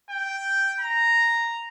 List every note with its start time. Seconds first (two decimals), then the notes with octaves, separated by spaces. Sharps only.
0.10 G5
0.80 A#5